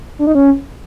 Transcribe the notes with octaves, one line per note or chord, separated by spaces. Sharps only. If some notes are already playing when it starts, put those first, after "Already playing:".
D4
D#4
C#4